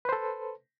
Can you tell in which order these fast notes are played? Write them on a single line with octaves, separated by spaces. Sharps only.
B4 C5 A4